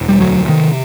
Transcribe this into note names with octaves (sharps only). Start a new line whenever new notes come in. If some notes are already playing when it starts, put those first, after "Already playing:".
Already playing: E1
G3
D2 F#3
C3 D#3